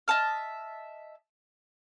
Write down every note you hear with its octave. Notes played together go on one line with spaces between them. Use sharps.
D#5 E5 A5 F6